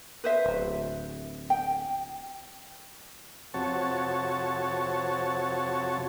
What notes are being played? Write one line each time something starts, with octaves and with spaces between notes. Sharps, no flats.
B4 C5 E5
D1
G5
F2 C3 F#4 C#5 A5